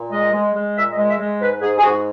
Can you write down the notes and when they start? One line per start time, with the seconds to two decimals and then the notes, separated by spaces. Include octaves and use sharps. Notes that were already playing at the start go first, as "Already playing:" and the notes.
Already playing: A#2
0.10 G#3 D#5
0.33 G#3
0.54 G#3
0.76 A#2 E5
0.92 D#5
0.97 G#3
1.07 E5
1.18 G#3
1.40 G#2 B4
1.61 G#2 G#4
1.78 G#4
1.82 G#2 F#4